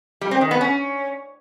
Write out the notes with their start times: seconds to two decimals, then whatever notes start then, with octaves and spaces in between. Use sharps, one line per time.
0.21 G3
0.31 C4
0.41 D#3
0.51 B3
0.61 C#4